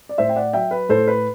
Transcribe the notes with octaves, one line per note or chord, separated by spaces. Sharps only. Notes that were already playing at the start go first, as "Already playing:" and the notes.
D5
A2 C5 E5
G5
D5 F#5
F#3 E5 G5
B4
A2 A4 C5
B4